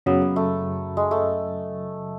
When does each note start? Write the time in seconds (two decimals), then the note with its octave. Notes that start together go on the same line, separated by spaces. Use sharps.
0.06 F#2 C#3 F#3 B3
0.22 A#3
0.36 A3
0.97 G#3
1.11 A3